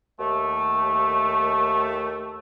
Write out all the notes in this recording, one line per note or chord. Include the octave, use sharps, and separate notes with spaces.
D#2 A3